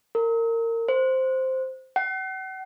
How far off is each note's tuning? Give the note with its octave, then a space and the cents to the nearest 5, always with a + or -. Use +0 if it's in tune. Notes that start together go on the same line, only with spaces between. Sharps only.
A#4 -25
C5 +0
F#5 +40